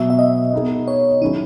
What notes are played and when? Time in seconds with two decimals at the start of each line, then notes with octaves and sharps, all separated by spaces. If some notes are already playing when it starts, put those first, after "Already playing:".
Already playing: B2 F#3 B3 E5
0.10 E5
0.19 D#5
0.53 B3 D#4 G#4
0.88 C#5
1.21 D#3 F#3 C#4 D#4 E4 G#4